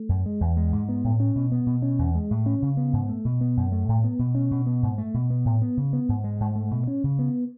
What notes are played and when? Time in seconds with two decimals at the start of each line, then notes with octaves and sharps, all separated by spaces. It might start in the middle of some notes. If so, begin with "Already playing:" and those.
Already playing: A3
0.09 F#2
0.26 G#3
0.41 E2
0.57 G#3
0.73 G#2
0.89 B3
1.04 A2
1.20 C#4
1.36 B2
1.52 B3
1.66 B2
1.82 C#4
1.99 E2
2.15 G#3
2.31 A2
2.46 C#4
2.62 C#3
2.77 B3
2.93 G#2
3.09 A3
3.25 B2
3.41 B3
3.57 F#2
3.72 A3
3.88 A2
4.04 B3
4.19 B2
4.35 C#4
4.51 B2
4.66 B3
4.83 G#2
4.98 A3
5.14 B2
5.30 B3
5.45 A2
5.62 B3
5.77 C#3
5.93 B3
6.09 G#2
6.24 G#3
6.40 G#2
6.55 A3
6.71 B2
6.87 C#4
7.04 C#3
7.19 B3